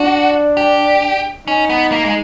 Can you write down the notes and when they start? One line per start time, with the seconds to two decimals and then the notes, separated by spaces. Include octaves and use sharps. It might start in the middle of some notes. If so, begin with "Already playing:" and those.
Already playing: D4 F#4
0.57 G4
1.47 C#4 D#4
1.70 B3
1.92 A#3
2.05 G#3